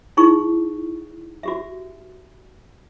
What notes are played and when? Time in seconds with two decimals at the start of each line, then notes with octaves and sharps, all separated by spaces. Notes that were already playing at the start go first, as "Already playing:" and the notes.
0.17 D#4 E4 G#4 C#6
1.43 F#4 G4 E5